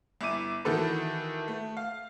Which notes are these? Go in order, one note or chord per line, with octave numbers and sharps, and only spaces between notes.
G1 E4 D6 D#7
D#3 E3 F#4 A4 B4
A3
F5